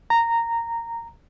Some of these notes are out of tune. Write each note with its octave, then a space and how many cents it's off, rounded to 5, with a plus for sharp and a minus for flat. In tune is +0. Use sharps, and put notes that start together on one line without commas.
A#5 -10